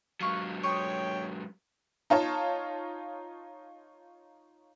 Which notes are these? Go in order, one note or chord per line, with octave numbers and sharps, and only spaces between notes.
G#2 F#3 F4 C#6
C#5 G5 C6 C#6 D#6
D#4 F4 C#5 A5